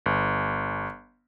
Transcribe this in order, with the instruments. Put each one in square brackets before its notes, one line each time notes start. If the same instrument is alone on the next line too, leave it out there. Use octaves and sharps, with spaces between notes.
[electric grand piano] G1